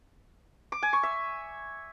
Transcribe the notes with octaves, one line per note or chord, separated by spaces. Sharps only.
D6
G#5
C#6
E5